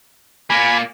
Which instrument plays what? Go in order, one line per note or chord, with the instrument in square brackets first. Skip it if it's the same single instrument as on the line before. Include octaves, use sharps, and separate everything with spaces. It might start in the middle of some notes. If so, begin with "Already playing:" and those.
[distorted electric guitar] A#2 A#3 [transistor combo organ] G#5 B5